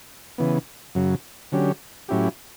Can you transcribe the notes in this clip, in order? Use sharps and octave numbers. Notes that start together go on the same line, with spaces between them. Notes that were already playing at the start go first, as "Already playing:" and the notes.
C#3 E3 B3
F#2 C#3 F#3
D3 F#3 C#4 G4
A2 F#3 C#4 E4 G4